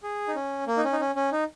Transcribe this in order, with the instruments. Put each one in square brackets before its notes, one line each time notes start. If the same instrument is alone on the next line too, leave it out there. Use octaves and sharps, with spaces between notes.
[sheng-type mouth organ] G#4
D#4
C#4
A#3
D#4
C#4
D#4
C#4
C#4
D#4